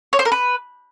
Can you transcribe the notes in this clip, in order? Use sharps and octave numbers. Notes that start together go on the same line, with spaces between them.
C#5
C5
A#4
B4